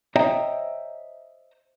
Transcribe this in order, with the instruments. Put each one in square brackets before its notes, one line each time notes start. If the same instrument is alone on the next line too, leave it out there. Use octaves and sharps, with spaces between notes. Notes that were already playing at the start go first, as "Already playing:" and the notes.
[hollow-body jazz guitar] C5 C#5 D#5 E5 G5 A#5